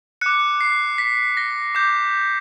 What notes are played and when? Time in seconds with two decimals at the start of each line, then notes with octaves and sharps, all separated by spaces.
0.21 D6 F#6 C#7
0.61 C7
0.98 B6
1.37 A#6
1.75 D6 G6